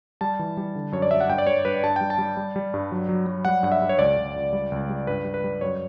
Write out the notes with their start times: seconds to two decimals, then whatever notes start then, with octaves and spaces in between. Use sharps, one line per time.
0.21 G3 A5
0.39 E3
0.57 G3
0.75 D3
0.92 F#2 C#5
1.02 D5
1.11 F#2 E5
1.21 F#5
1.29 G2 G5
1.38 D5
1.47 G3 C#5
1.65 G2 B4
1.84 G2 A5
1.96 G3 G5
2.10 A5
2.18 G3
2.37 G3
2.56 G3
2.74 G2
2.92 F#3
3.09 F#3
3.27 F#3
3.45 G3 F#5
3.63 G2 F#5
3.72 E5
3.82 G2
3.89 C#5
3.99 C#2 D5
4.17 C#2
4.36 C#2
4.53 G3
4.72 C#2
4.89 G3
5.07 G2 B4
5.25 G3
5.34 B4
5.44 G3
5.61 F#2 C#5